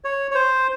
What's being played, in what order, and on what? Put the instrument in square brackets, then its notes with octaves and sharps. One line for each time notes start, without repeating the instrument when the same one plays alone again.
[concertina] C#5
C#5
C5